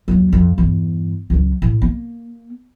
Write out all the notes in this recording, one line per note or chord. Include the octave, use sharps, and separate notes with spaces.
D#2 F#3
F2
E2 G2
C#2 F#3
A2
A#3